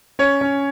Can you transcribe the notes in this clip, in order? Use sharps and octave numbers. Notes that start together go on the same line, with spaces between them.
C#4 C#5
C#4